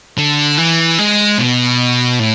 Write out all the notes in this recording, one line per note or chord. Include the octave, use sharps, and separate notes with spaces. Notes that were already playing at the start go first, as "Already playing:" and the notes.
D3
E3
G#3
B2
A2